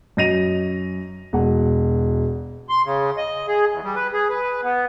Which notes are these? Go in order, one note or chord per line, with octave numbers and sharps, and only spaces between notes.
F#2 D#5 A#6 D#7 F7
E1 F#5
C6
C#3
D#5
G#4
E2
G3
B4
G#4
B4
B3